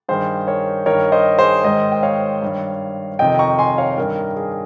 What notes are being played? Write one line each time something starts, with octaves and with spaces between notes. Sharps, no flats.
G2 D#3 G#4 C5
A#4 C#5
G2 D#3 A#4 C#5
C5 D#5
G#4 C5
G#2 D#3 C5 D#5
G5
C#5 F5
G2 D#3
F2 C3 D#3 D#5 G5
A#5 C#6
G#5 C6
C#5 F5
G2 D#3 A#4
G#4